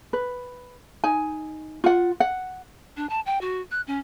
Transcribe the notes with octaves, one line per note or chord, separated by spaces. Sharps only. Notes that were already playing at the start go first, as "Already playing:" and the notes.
B4
D#4 G#5
F4 F#5
F#5
D4
A5
G5
F#4
F#6
C#4